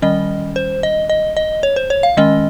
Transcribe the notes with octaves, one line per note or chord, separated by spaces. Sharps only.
D#3 G3 C#4 D#5
C5
D#5
D#5
D#5
C#5
C5
C#5
F5
D#3 G#3 C#4 D#5